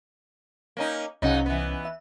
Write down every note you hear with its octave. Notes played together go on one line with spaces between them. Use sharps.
A#3 C#4 D#4
C2 C#3 F#3 C#4 D#4 F#5
E3 B3
E5